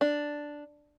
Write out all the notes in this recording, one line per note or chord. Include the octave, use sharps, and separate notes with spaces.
D4